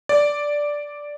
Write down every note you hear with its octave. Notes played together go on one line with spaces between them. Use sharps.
D5